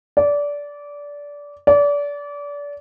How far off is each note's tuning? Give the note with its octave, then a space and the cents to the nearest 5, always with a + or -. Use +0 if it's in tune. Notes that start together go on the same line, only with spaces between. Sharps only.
D5 -20
D5 -30